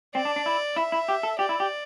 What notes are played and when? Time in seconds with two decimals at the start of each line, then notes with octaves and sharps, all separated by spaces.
0.15 C4 D5
0.25 D4
0.36 D4
0.46 E4
0.76 E4 E5
0.92 E4
1.08 G4
1.23 A4
1.39 G4 D5
1.49 E4
1.60 G4